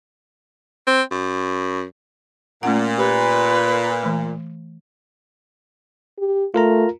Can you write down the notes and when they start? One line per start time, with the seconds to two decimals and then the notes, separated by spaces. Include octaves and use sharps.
0.87 C4
1.11 F#2
2.63 A#2 A3 C#4 F#5
2.98 G4 B4
4.03 E3 A3
6.18 G4
6.54 A3 F4 A#4 A#5